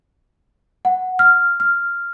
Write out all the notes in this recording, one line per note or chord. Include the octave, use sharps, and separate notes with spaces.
F#5
F6
F6